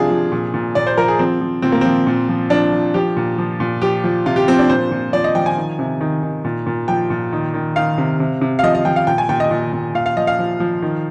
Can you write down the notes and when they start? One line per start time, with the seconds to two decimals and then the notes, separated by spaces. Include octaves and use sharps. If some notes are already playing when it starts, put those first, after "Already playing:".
Already playing: C3 F3 D4 F4 G#4
0.10 F3
0.32 A#2
0.54 A#2
0.75 A#2 D5
0.87 C5
0.97 F3 A#4
1.08 G#4
1.19 F3 C4
1.41 F3
1.62 A#2 C4
1.72 A#3
1.81 F3 C4
2.07 A#2
2.29 F3
2.50 F3 D4
2.72 F3
2.94 F3 G4
3.17 A#2
3.38 F3
3.60 A#2
3.82 F3 G4
4.04 F3
4.26 C3 F4
4.36 G4
4.48 F3 C4
4.59 D4
4.69 A#2 C5
4.91 A#2
5.13 F3 D5
5.24 D#5
5.35 F3 G5
5.46 G#5
5.57 D#3
5.79 C3
6.01 D#3
6.23 D#3
6.44 A#2
6.67 A#2
6.88 F3 G5
7.10 A#2
7.32 D#3
7.54 D#3
7.76 D#3 F5
7.98 C3
8.20 C3
8.41 C3
8.59 F5
8.63 F3 D#5
8.75 D#5
8.85 F3 G5
8.96 F5
9.07 A#2 G5
9.18 G#5
9.29 A#2 G5
9.40 D#5
9.51 A#2
9.73 A#2
9.95 A#2 F5
10.06 F5
10.17 F3 D#5
10.27 F5
10.39 F3
10.60 F3
10.82 D#3